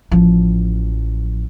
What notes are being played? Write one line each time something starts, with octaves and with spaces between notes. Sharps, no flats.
A1 F3